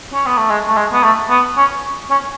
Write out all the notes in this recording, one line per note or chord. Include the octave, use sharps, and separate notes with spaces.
C#4
B3
A3
G#3
A3
G#3
B3
A3
B3
C#4
C#4